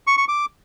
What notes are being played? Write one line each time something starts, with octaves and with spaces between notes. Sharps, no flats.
C#6
C#6
D6